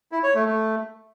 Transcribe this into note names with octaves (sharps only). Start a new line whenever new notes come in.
E4
C#5
A3
A3